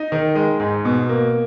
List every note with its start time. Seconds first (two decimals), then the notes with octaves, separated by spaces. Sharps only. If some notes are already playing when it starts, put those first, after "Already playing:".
Already playing: D#4
0.12 D#3
0.35 G#3
0.60 G#2
0.85 B2
1.09 A#3